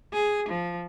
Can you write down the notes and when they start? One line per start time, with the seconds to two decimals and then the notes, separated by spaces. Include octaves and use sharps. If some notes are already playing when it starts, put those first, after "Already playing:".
0.13 G#4
0.49 F3